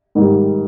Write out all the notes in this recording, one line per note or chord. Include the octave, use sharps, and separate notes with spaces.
G#2 D#3 G3